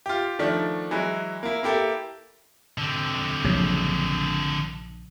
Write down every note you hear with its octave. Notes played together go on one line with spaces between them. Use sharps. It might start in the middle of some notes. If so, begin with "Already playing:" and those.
F4 G4
D#3 F3 A3 D4
E3 F#3 G#3 E4
A#3 E4
A#3 E4 G4 A4
D3 C4
A#1 C#3 F#3